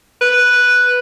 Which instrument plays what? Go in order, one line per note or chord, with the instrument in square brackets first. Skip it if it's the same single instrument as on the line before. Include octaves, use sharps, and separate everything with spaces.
[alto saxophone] B4